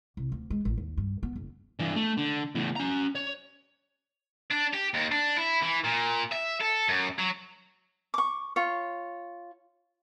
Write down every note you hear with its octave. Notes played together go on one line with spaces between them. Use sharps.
C2
D2
G#3
A1
D#2
G2
B3
F#1
G2 E3
A3
D3
E2 A2
C#4 A#5
C#5
D4
G4
D#2
D4
E4
E3
A#2
E5
A4
F#2
F#3
C#6 D6
F4 C#5